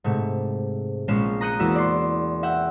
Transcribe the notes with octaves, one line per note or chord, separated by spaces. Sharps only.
G#2 C3 A3
A#1 G#3 C#4 E7
A#5 D#6 F#6 G6 C#7 D#7
E2 A#3 F#4 E6 B6
D5 C6
E5 F#5 G5